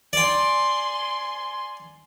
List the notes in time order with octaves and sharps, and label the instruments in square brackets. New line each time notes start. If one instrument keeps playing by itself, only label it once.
[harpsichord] D5 G5 [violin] G#5 C6